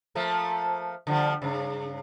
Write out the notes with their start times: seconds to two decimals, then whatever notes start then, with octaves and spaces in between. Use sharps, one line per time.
0.15 F3 A3 A#3
1.07 D3 F3 G3
1.42 G2 C#3